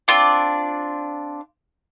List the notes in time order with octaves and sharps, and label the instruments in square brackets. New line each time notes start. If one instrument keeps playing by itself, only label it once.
[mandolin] C4 D4 F4 D5